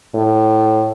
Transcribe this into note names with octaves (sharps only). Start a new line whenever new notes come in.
A2